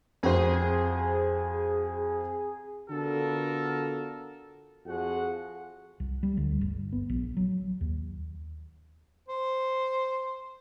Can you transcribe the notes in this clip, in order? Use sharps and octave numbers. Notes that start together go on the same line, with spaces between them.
F2 F#4 G#4 C5
D3 B3 F4 F#4 A4 A#4
F2 F3 F#4 G#4 F#5
C2
G3
D2
G1
B3
A#1
F#3
D#2
C5